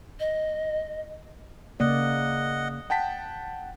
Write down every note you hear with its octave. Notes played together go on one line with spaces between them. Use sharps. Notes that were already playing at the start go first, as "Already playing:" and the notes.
D#5
C#3 A#3 D5 D#5 F#5
F#5 G5 A5 B6